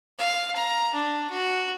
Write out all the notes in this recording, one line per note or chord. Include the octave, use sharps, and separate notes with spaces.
F5
A#5
D4
F#4